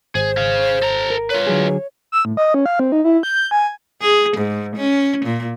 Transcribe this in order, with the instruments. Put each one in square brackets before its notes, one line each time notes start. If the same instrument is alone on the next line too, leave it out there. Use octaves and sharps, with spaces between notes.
[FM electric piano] G#1 [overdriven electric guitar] G#4 [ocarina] C5
[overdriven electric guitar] G#4 F5
A4 A#5
[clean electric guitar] A#4
[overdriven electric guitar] F4 B4 [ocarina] C#5
[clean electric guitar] D3 F#3 G#4
[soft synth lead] E6
A2
D#5
C#4
F5
C4
D#4
E4
G6
G#5
[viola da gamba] G#4
G#2
C#4
A#2